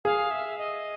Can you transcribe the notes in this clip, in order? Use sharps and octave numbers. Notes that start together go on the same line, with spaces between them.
G#4 F5
E5
D#5